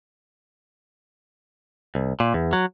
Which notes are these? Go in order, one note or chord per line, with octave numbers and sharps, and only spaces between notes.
C2
A#2
E2
F#3